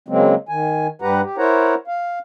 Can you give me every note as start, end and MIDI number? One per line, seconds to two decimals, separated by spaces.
0.08 0.35 49
0.08 0.35 54
0.08 0.35 56
0.08 0.35 58
0.08 0.35 60
0.49 0.87 51
0.49 0.87 80
1.02 1.21 43
1.02 1.21 55
1.02 1.21 67
1.02 1.21 71
1.02 1.21 78
1.02 1.21 82
1.22 1.37 67
1.38 1.75 64
1.38 1.75 70
1.38 1.75 72
1.38 1.75 73
1.38 1.75 78
1.38 1.75 82
1.87 2.19 77